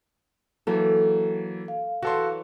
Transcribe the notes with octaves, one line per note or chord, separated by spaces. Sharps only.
E3 F#3 A#3 A4
F5
E3 F#3 F#4 A4 C6